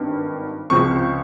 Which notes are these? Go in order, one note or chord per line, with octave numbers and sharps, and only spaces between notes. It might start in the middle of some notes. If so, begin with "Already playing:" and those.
Already playing: G#1 G2 D#3
C#2 C#3 F3 C4 C#6